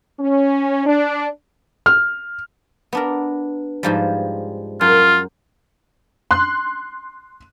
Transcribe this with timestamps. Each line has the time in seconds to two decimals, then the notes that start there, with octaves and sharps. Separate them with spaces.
0.20 C#4
0.86 D4
1.86 F6
2.93 B3 D4 A#4
3.83 G#2 F3 G3
4.81 F#2 F4
6.31 C6 F#6